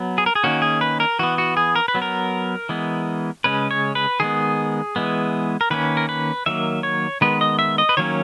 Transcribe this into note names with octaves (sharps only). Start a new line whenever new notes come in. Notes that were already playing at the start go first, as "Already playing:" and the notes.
Already playing: F#3 B3
G#4
A#4
G#4
D#3 A#3 C#4 F#4
G#4
B4
A#4
E3 B3 F#4
F#4
G#4
A#4
B4
F#3 B3
A#4
E3 G#3 B3
C#3 G#3 C#4 B4
C#5
B4
D#3 G#3 B3 G#4
E3 G#3 B3
A#4
D#3 A#3 C#4 B4
A#4
B4
D#3 F#3 A#3 E5
C#5
D#3 G#3 B3 B4
D#5
E5
D#5
B4
D#3 F#3 A#3 C#4 C#5